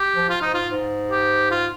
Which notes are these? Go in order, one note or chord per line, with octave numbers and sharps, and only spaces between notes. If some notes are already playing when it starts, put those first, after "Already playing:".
Already playing: G4
F3
F4
G#2 D#4
F4
G#2
G4
F4